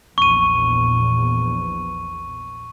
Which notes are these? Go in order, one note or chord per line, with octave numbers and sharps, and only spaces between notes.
A#1 E2 C#6 D#7